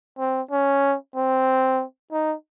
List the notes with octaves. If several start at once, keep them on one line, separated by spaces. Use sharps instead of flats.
C4
C#4
C4
D#4